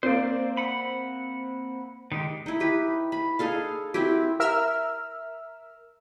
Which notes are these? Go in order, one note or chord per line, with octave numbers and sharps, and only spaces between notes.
A#3 C4 C5 D5
F#5 B5
D#3 G#3 G4
D#4 E4
G4 B4
B5
D#4 G#4 A4 F5
C4 E4 F#4 G4
A#4 E5 E6 F6